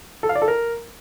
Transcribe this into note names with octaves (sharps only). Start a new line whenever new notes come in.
A4
F5
D5
A4
A#4